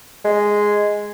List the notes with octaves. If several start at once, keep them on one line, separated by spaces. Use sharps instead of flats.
G#3